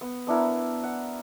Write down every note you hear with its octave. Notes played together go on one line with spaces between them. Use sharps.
B3
B3 D4 E4 A#4
F#5